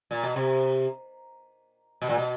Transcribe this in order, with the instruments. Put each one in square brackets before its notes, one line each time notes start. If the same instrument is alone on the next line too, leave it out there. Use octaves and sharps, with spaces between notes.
[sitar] A#2
B2
C3
B2
A#2
B2